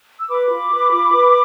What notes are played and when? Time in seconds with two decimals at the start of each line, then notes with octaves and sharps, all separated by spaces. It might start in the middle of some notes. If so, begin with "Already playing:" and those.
0.18 E6
0.29 B4 B5 D6
0.50 F4
0.71 B4
0.91 F4
1.12 B4